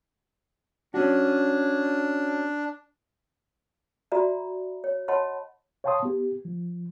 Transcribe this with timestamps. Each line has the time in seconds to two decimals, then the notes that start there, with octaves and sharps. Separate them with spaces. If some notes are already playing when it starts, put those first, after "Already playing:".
0.94 C#4 D4 F#4
4.12 F#4 D5 E5 A#5 B5
4.84 C#5
5.08 C#5 D#5 F#5 A5 B5 C6
5.84 C#5 F5 G5 A5 C6 D#6
6.03 B3 G4
6.45 F3